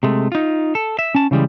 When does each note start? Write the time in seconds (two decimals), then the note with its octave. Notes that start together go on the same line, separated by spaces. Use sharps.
0.03 C3 G#3 A3
0.32 D#4 F4
0.75 A4
0.99 E5
1.15 C#4 A5
1.31 C#3 E3 G3 G#3